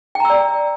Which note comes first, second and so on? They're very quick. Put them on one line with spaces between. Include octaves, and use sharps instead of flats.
G5 A#5 E6 D5